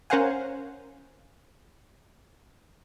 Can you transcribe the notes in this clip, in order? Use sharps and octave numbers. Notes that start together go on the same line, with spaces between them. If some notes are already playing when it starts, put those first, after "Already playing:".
C#4 A#4 C5 F5 F#5 G#5